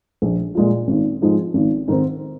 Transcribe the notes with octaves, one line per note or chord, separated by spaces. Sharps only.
A#1
A#2 G#3 F4
G#1
G#2 F3 G#3
G#1
G#2 D#3 C4